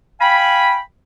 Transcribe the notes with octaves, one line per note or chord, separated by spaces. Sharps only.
F5 G5 G#5 B5